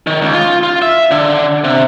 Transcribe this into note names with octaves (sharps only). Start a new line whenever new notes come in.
D#3
C#2
F4
F4
E5
D3
C3